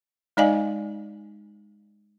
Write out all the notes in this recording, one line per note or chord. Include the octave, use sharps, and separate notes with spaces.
G#3 D#4 D5 D#5 F5 G#5